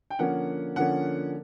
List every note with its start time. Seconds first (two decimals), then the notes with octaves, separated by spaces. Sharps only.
0.10 G5
0.19 D3 F3 A#3 C#4 F#5
0.76 D3 F3 A#3 C#4 F#5